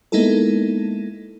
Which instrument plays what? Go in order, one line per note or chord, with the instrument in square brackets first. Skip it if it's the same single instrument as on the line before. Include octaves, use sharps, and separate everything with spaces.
[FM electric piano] G#3 A#3 B3 D#4 E4 A4